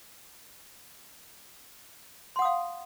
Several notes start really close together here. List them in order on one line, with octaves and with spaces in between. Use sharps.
C6 F#5 D#6 F5